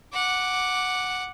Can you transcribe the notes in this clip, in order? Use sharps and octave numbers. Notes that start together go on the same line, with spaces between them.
F#5 D6